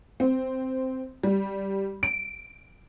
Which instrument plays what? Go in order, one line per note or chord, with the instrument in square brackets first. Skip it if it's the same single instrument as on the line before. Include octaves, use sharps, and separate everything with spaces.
[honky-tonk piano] C4
G3
D7